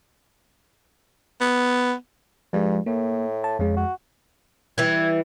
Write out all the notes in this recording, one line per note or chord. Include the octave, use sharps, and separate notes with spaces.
B3
G2 F3 G#3
A2 A#3
A5
F2 C#3 G#3
F#4
E3 G3 G#6